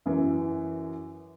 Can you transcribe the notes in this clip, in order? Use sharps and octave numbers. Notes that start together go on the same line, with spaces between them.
F#2 E3